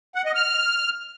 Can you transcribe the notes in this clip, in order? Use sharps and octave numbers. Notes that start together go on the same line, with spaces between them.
F#5
D#5
F6